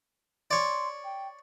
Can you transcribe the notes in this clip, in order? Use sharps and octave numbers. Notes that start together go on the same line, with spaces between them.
C#5 D5 C6
G5